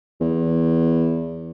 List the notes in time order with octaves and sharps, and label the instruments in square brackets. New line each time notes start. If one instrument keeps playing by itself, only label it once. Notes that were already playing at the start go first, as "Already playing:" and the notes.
[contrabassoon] E2